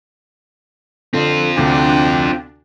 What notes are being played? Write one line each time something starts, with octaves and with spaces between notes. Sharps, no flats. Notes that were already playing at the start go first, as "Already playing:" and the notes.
D3 C4 F4
D2 C3 D4 G5